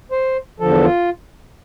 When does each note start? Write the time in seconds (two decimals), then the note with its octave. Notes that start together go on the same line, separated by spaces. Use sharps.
0.12 C5
0.60 E2 D3 F3 A4
0.84 F4